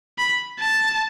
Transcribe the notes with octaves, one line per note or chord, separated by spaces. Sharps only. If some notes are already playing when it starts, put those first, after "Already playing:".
B5
A5